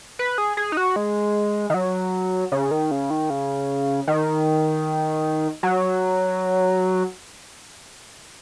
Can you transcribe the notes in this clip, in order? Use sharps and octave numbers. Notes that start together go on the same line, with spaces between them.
B4
G#4
G#4
D#4
F#4
G#3
D#3
F#3
C#3
D#3
C#3
D#3
C#3
D#3
F#3